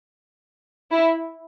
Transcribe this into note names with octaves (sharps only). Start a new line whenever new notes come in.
E4